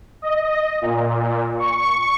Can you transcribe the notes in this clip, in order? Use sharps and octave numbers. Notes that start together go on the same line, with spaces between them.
D#5
A#2
C#6